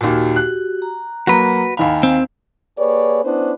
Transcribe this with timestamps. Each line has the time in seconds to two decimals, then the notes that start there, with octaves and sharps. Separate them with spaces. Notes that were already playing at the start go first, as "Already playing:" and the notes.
0.01 D#2 A#2 F#4 G4
0.36 F#6
0.82 A#5
1.27 F#3 A#3 F#4 B4
1.77 D#2 D#3 F5 G#5 B5
2.03 C4
2.77 A#3 G4 G#4 B4 C#5 D5
3.24 B3 C#4 D4 E4 B4 C5